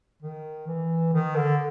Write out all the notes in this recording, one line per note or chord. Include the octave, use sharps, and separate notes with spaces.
D#3
E3
D#3
D3